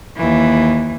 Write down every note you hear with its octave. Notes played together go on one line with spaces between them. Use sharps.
D#2 E3